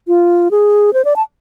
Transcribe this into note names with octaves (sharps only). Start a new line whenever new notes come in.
F4
G#4
C5
D5
A5